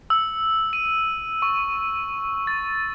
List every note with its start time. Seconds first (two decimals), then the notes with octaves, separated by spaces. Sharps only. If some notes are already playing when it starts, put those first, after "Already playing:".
0.10 E6
0.73 D#7
1.42 C#6
2.47 A6